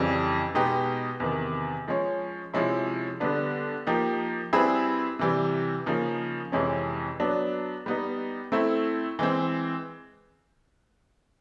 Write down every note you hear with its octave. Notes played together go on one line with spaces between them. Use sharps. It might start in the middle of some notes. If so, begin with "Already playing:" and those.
Already playing: F2 C#3 E3 G3
B2 G#3 B3 D#4 G4
E2 C3 D#3
F3 G#3 C#4
C3 F3 G#3 C#4 E4
D3 G3 B3 D4
F3 A#3 D#4 G4
G3 C4 E4 G#4 B4
C3 E3 G3
C#3 F3 A#3 D#4
F2 C3 E3 G#3 C#4
F#3 B3 D4
G3 B3 D#4
A3 C4 E4
E3 G#3 C4